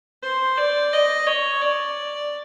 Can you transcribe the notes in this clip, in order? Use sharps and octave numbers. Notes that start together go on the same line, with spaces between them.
C5
D5
D#5
C#5
D5